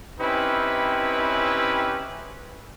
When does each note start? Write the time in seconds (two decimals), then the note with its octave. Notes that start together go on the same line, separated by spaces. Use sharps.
0.20 C4 C#4 D#4 E4 G4 B4